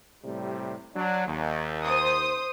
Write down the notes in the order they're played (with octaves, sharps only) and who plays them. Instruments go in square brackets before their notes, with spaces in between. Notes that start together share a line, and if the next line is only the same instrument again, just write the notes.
[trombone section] A2 C3 G3
F#3 D4
D#2
[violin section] C5 D#6